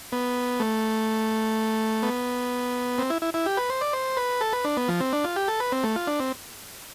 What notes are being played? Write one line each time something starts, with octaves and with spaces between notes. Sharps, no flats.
B3
A3
B3
C4
E4
E4
E4
G4
B4
C5
D5
C5
B4
A4
B4
D4
B3
F3
C4
D4
F4
G4
A4
B4
C4
A3
F4
D4
C4